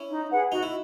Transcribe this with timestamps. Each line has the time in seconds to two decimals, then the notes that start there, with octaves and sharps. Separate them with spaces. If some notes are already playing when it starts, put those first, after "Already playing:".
Already playing: C#4 E4
0.09 D#4
0.31 G#4 B4 F#5
0.52 D#4 F#4
0.63 E4